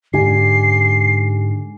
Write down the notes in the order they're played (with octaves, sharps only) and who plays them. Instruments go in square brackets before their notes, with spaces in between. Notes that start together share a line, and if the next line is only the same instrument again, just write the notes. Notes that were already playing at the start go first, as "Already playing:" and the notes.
[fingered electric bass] G#2 D3 [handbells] G4 G#5 [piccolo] C7